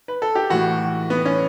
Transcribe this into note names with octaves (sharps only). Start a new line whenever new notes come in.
B4
A4
G4
A2 E3 F#4
B3
C#4